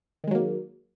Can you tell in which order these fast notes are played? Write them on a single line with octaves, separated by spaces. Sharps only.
D#3 G#3 F#3 A#3